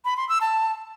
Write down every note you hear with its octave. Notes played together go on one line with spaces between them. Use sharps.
B5
C6
E6
A5